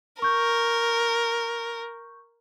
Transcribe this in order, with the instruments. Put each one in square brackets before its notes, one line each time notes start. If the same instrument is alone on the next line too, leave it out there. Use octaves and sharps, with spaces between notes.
[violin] A#4 [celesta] C#6 G6